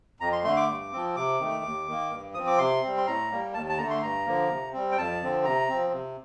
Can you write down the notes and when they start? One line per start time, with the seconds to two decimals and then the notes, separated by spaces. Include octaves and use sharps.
0.20 F2 A#5
0.32 C6
0.44 D3 A3 C6
0.57 D6
0.68 G2
0.92 F3 C4
1.16 C3 D6
1.40 D#3 A3
1.64 D#2
1.88 D#3 A#3
2.11 G2
2.34 F3 C4 D#6
2.47 D6
2.59 C3 C6
2.83 G3 C4
2.98 C6
3.06 A2 A#5
3.31 G3 A#3
3.54 D#2 A5
3.69 A5
3.78 D3 A#5
3.83 A3
3.90 C6
4.02 G2 A#5
4.25 D3 F3 A#3
4.50 C3
4.73 G3 C4
4.92 G5
4.98 F2 A5
5.22 D3 F3 C4
5.45 C3 A#5
5.69 F3 C4
5.93 C3